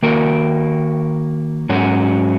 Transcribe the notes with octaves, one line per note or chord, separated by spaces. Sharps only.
D#3 A#3 F#4 A#4
G#2 F#3 C#4 F#4